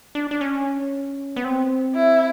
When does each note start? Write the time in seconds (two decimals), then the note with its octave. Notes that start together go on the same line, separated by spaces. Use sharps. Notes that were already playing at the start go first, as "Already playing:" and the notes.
0.15 D4
0.31 D4
0.41 C#4
1.36 B3
1.44 C4
1.95 E4